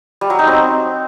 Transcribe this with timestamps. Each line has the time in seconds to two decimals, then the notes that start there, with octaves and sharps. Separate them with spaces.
0.21 G3
0.30 F#3
0.39 D#4
0.47 C4